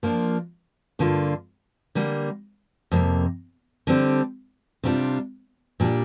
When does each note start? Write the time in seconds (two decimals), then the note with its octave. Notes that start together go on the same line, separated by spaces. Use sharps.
0.03 F3 A#3 D4 F4
0.99 G2 D3 A#3 F4
1.95 D3 G3 A#3
2.91 F2 C3 A#3
3.87 D3 G3 C4
4.83 C3 G3 D4 F4
5.80 A#2 G3 D4 G4